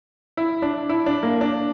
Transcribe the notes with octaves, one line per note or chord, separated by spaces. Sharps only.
E4
D4
E4
D4
A#3
D4